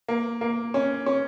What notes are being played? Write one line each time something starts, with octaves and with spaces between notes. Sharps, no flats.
A#3
A#3
C#4
C#4